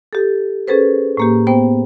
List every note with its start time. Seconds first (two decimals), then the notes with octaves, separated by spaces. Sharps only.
0.13 G4 A4
0.68 C#4 G#4 A4 B4 C5
1.17 A2 A#3 G4
1.47 B3 C5 G5